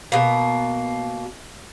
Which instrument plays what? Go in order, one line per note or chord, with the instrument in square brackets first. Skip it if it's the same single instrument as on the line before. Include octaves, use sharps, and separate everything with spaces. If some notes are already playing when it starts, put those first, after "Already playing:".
[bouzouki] B2 A#3